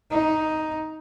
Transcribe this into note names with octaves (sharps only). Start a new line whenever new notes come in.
D#4